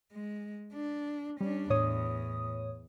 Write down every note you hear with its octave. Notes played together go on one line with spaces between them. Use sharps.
G#3
D4
G3 C#4 D4
E2 A2 C#5 D#6